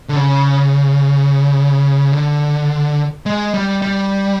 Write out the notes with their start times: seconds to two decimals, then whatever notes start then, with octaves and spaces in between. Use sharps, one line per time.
0.09 D3
0.16 C#3
2.12 D3
3.26 G#3
3.54 G3
3.82 G3